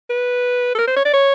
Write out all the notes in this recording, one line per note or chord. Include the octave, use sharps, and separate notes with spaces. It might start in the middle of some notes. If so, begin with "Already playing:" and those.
B4
A4
A#4
C5
C#5
D5
C#5